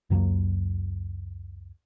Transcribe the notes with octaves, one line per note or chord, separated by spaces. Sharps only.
C#2 F#2 F#3 A#3